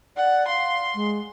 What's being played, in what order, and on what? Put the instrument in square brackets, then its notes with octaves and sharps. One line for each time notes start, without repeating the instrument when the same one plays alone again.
[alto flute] D5 [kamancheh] F#5
[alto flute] F5 [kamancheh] C6
[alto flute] G#3